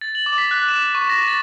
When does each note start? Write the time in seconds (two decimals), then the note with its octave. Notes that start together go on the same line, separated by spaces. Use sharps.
0.01 A6
0.15 F#7
0.26 D6
0.38 B6
0.51 F#6
0.68 E7
0.95 C#6
1.09 A#6
1.28 A6